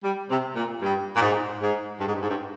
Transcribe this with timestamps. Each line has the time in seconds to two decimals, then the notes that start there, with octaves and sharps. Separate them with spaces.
0.03 G3
0.30 C3
0.56 A#2
0.82 G2
1.16 A#2
1.21 G#2
1.61 G#2
2.00 G2
2.07 G#2
2.14 G2
2.22 G#2
2.29 G2